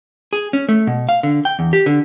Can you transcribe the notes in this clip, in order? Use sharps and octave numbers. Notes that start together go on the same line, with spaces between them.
G#4
C#4
A3
B2
F5
D3
G5
E2
G4
D3